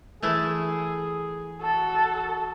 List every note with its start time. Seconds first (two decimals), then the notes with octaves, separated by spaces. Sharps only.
0.23 E3 A3 E4 G#4
1.61 F#4 A4